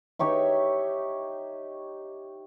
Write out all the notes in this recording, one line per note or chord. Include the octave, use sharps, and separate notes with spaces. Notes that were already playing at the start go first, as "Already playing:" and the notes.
D#4 G4 C#5 E5